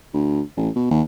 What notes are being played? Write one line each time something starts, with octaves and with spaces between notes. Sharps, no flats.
D2
A1
B2
D#2